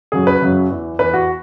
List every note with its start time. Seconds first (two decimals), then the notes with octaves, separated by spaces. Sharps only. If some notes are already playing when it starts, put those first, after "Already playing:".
0.12 F#2 C#3 F#3 G#4
0.27 B4
0.41 F#2 C#3 F#3
0.70 E2 E3
0.99 E2 E3 B4
1.14 F#4